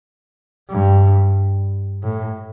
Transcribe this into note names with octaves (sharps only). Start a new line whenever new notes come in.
G2
A2